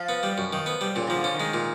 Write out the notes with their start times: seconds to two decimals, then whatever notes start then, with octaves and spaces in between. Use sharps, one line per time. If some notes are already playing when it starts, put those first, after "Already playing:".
Already playing: F3
0.09 B3
0.23 G3
0.38 F#2
0.53 D#3
0.66 B3
0.81 G3
0.95 A#2 C#3
1.07 D#3
1.10 F3
1.15 D3
1.24 C#4
1.34 D#3
1.40 G#3
1.53 A#2